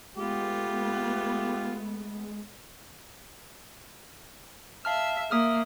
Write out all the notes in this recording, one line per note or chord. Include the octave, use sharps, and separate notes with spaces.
G#3 A3 B3 F4 G4
E5 F5 A5 F6
A#3 E5 D#6 F6